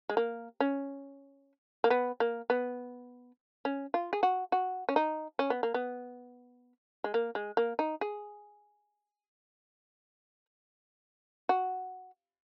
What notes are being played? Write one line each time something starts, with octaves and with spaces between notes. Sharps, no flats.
G#3
A#3
C#4
A#3
B3
A#3
B3
C#4
F4
G#4
F#4
F#4
C#4
D#4
C#4
B3
A#3
B3
G#3
A#3
G#3
A#3
D#4
G#4
F#4